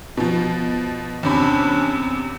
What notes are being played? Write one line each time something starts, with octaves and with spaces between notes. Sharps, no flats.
B2 F3
E2 C3 C#4 D4 B5